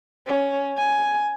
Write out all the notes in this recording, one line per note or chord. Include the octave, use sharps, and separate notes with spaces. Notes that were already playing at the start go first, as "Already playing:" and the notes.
C#4
G#5